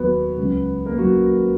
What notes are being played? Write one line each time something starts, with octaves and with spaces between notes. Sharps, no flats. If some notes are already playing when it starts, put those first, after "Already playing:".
Already playing: D#2 D#3 F#3 B3 F#4 B4
C#2 C#3 F#3
A#3 A#4
F#3 F#4